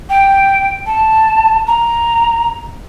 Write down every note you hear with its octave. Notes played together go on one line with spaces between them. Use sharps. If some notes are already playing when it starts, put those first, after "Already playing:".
G5
A5
A#5